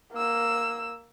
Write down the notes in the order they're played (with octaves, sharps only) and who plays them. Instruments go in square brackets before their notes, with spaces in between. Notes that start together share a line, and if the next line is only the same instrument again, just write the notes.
[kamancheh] A#3 E6